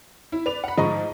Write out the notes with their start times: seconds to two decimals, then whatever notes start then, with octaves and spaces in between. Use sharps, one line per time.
0.32 E4
0.46 B4 D5 F7
0.64 F#5 B5
0.78 G#2 F3 D#5 A#5 C#6